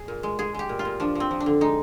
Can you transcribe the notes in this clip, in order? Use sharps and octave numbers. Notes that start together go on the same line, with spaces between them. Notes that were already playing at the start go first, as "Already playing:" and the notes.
Already playing: G#4
A#2
G#3
G#3 G#4
G#3 G4
A#2
F4
A#2
F3 D4
F3 C4
F3
D4
D3
G#3 D#4